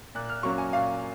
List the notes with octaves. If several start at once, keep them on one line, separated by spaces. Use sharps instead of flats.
A#2 F#6
F6
F#3 A#3 C#4 C#6
G#5
A#2 F5